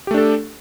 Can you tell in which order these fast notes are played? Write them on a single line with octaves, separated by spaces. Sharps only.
G4 A3 D4 A4